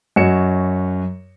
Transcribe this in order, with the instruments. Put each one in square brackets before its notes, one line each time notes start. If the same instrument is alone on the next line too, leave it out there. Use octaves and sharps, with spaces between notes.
[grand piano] F#2 F#4 C#5 D#5 C#7 E7